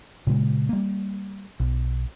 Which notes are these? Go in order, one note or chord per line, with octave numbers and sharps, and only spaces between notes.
A#2 C#3 G#3
G3 A#3
B1